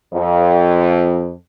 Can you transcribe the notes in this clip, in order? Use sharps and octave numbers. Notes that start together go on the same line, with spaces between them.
F2